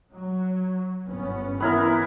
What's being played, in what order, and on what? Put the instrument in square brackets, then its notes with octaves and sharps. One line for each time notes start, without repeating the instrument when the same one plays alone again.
[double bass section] F#3
G1 B3 C#4
[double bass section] E3 [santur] B3 E4 A#4